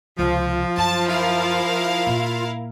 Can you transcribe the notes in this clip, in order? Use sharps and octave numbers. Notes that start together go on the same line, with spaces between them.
C#2 C3 F3 F4
F#2 A5
E4 A#4 F5
A#2